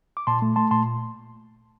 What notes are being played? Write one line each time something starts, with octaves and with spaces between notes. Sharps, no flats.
D6
A#2 A5 C6
A3
A3 A5 C6
A#2 A5 C6